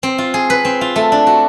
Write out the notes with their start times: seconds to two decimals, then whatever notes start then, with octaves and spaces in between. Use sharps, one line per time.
0.03 C4
0.18 F4
0.34 G#4
0.50 B4
0.65 C4
0.81 F4
0.96 A3
1.12 D4
1.27 F#4